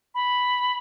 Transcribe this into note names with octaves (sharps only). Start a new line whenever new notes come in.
B5